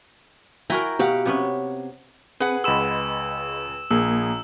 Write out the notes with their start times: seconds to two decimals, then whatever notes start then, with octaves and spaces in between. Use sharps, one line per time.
0.70 E4 F#4 A#4 G5 G#5 A#5
0.99 B2 G4 F5 F#5
1.26 C3 B3 C#4
2.40 C4 G#4 B4 F#5
2.64 C#2 G#4 D#5 B5 C6 E6 E7
3.91 A#1 A#3 G#4 A#5 E6